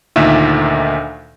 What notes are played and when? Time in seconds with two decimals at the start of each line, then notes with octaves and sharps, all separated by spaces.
0.16 D2 A#2 D#3 E5